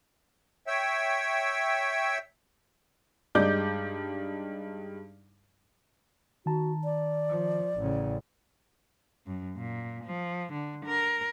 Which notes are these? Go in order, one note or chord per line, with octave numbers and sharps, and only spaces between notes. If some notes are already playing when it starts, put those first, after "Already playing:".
C#5 E5 G5 E6
G2 G#3 D#4 D5 D6 G6
D#3 F#4 A5 A#5
D5
F3
A1 C#3
F#2
A#2
F3
D3
A#4